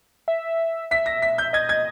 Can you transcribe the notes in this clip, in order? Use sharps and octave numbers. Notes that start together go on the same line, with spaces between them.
E5
E5 B6
A#6
B6
G6
D#5 G#6
G#6